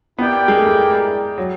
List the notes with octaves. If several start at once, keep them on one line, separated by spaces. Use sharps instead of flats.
B3 E4 G4 A#4 D5 G5
G#3
A3
G#3
F#3